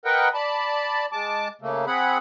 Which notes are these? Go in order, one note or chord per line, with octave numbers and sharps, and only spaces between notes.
A#4 B4 D#5 F#5 G5
D5 A5 B5
G#3 A5 D6
C#3 A3 A#3
C4 G#4 F#5 B5